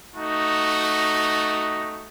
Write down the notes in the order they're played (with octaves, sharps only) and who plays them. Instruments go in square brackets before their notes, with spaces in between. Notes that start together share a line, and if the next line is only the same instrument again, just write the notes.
[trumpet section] A3 D#4 F#4